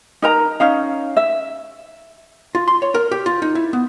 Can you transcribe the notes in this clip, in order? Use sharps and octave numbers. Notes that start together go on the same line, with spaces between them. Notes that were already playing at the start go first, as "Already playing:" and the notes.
D#4 A#4 A#5
C#4 D#4 F5
E5
F4
C6
C#5
A#4
G4
F4
D#4
E4
B3